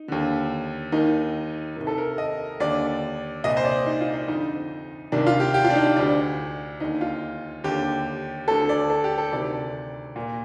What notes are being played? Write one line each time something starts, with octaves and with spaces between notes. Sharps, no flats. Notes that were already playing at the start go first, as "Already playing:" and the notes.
Already playing: D#4
D#2 D3
D#2 D#3 D#4
C2 C3 D#3
A4
A#4
D#5
D#2 D3 D5
C2 A#2 D#5
C5
D5
D#4
F4
D#4
F2 D3 D#4
C2 C3 D#3 D4
F4
G4
G4
F4
D4
D#4
D4
D2 D3 D4
D#2 D3 D#4
F4
D#2 D3 G4
D2 D3 A4
D5
A4
G4
A4
D2 C3 D#3 D5
A#2